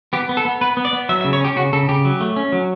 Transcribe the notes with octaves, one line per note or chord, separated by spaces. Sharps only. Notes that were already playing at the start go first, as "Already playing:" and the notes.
B3 G4
B3
A4
B3
B3 B4
B3
D5
B3
F#3 E5
E5
C#3
C#5
C#4 G4
C#3 F#4
C#3 A4
C#3 G4
F#3
A3
C#4
F#3